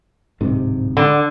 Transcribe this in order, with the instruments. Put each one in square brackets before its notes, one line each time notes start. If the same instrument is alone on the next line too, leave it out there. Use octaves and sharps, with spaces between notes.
[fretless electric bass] D1 G#2 C3
[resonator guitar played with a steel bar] D3